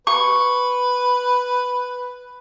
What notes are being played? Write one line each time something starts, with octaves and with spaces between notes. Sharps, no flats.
B4 C#6